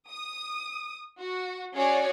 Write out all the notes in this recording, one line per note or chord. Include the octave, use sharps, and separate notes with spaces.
D#6
F#4
C#4 F#4 G#4 C#5 D5